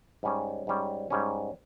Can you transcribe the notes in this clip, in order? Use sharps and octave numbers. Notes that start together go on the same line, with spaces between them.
G#2 G3 C#4
G#2 G3 C#4
G#2 G3 C#4